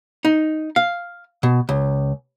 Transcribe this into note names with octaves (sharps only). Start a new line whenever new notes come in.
D#4
F5
B2
C#2